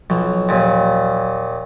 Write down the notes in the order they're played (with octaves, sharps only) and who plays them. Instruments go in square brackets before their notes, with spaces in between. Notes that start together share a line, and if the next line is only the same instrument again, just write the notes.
[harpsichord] B1 [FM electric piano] F3 F#3
[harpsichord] D#2 A#2